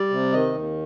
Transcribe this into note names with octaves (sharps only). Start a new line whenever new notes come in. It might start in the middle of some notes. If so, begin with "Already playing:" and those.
Already playing: G3 D5
C3
D#3 D#5
D#2